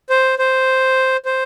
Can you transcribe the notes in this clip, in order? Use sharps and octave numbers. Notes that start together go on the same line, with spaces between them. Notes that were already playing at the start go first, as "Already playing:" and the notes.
C5
C5
C5